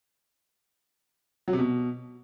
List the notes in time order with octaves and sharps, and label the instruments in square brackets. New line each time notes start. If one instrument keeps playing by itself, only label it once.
[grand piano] F#3
C3
B2